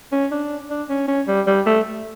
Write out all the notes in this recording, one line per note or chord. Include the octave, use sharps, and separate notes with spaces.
C#4
D4
D4
C#4
C#4
G3
G3
A3